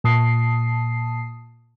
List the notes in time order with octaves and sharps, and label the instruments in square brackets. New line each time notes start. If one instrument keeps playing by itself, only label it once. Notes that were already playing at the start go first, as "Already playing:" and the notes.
[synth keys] A#2 A5 D#6 C7